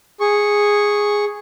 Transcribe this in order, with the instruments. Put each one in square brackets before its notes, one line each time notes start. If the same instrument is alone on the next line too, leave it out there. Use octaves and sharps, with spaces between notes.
[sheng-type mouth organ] G#4 C#6